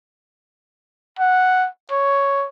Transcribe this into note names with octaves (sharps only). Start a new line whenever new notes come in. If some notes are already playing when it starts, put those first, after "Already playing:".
F#5
C#5